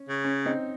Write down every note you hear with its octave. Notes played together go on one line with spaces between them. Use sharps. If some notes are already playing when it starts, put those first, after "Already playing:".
Already playing: C#4
C#3
C#4
C4 D#4